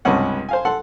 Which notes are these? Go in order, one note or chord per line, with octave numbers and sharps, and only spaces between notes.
C#2 G2 C3 C#4 F#5
C5 F5 G#5
A4 F#5 C6